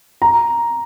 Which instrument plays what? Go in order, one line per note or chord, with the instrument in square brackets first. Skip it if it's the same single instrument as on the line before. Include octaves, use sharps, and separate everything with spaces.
[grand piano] A#5